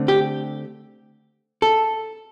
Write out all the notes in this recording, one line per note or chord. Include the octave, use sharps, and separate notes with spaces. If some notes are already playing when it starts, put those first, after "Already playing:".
Already playing: D3 A3 C4
G4
A4